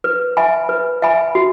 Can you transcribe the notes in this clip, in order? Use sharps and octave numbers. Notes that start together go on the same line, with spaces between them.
B4
E5 G#5 B5
B4
E5 G#5 B5
F#4